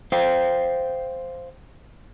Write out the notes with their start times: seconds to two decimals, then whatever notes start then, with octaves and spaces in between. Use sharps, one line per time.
0.12 C5 F5 G5